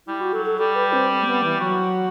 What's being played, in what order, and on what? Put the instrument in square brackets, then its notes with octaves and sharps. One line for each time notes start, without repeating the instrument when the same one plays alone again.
[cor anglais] G3 [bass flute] E4
[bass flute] F#4
[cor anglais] F#3 [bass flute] A4
[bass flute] A4
[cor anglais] G3 [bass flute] A4
[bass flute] B4
C4
A3
B3
E3
[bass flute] F#3 [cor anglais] F#4